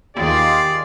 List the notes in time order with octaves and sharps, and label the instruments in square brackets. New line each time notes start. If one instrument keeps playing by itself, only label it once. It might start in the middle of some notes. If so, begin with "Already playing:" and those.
[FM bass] D#2 [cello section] D#3 F4 G#4 [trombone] G4 [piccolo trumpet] D5